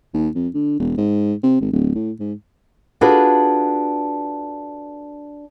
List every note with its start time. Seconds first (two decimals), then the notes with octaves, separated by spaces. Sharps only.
0.14 D#2
0.35 F2
0.54 D3
0.79 E1
0.98 G#2
1.43 C3
1.61 G#1
1.72 D1
1.95 A2
2.20 G#2
3.01 D4 F4 F#4 G#4 A4 B4